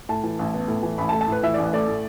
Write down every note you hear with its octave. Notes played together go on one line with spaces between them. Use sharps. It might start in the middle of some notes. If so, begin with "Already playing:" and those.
A2 A5
E3
A1
B3
A2
E3
A1 B5
A5
A3
A5
A2 B4
E3 E5
A1 D5
B4
A3 D5
A2